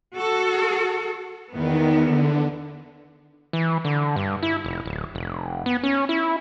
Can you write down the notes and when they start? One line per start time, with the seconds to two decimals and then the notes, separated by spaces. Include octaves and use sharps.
0.15 F#4 A4
1.52 E2 D#3 B3
2.05 D3
3.53 E3
3.85 D3
4.16 G2
4.43 E4
4.65 F1
4.86 D1
5.15 F1
5.66 B3
5.83 C#4
6.09 E4